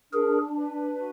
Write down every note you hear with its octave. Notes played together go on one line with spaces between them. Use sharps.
D4 G#4 A#4
B4
F#4